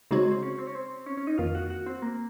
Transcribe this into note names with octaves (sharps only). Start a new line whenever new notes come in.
C#3 G#3 C4 D#4 F#4 C#5
C4
C#4
C4
C#4
C4
C#4
C#4
D#4
F2 D#3 A#3 F4
F#4
F#4
C4
A#3